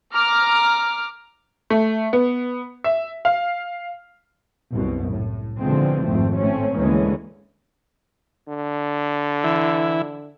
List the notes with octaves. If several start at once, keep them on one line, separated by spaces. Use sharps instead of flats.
A#5 D6 F6
A3
B3
E5
F5
C2 F#2 B2
A2
B2 D3 E3 F3 G#3 C4
G#1 F2 A3 C4
A2 A3 C4 C#4
D2 D3 E3 G#3 A#3 C#4
D3
E3 E4